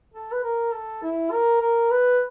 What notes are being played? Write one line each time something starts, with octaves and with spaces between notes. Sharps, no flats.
A4
B4
A#4
A4
E4
A#4
A#4
B4